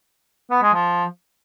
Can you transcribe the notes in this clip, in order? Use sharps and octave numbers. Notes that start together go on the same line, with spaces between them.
B3
G#3
F3